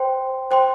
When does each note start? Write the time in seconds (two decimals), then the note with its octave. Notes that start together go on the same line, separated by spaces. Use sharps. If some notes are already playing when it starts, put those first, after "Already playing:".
Already playing: C5 G5 C6
0.51 C5 G5 C6